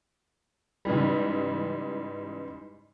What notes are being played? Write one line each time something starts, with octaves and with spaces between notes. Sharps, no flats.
G#2 C#3 E3 G3